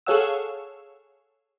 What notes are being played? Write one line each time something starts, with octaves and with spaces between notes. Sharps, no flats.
G#4 A4 C#5 F5 F#5 E6